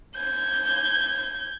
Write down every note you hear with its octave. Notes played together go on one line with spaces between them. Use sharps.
G6 G#6